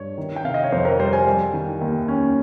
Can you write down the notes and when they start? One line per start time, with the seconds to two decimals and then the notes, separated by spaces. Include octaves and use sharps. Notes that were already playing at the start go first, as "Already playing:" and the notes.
Already playing: G2 C#5
0.18 D#3
0.36 G5
0.44 C3 F5
0.54 D#5
0.64 C#5
0.72 F2 C5
0.85 A#4
0.99 G3 C5
1.13 G#5
1.27 G3
1.54 D#3
1.81 D#2
2.08 C#4